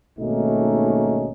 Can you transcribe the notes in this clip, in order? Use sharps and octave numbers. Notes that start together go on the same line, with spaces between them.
G#1 B2 A3 A#3 C#4 D#4